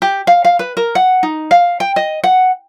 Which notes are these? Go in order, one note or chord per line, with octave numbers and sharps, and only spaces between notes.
G4
F5
F5
B4
A#4
F#5
D#4
F5
G5
D#5
F#5